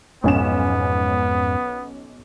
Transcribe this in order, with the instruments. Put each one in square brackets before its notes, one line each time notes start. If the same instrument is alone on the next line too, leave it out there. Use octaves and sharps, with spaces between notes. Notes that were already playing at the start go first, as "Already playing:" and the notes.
[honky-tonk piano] B1 C#4 E7 [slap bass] F2 G#2 G#3 [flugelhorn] B3